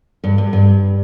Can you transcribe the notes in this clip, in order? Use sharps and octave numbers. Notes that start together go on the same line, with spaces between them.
G2
G2
G2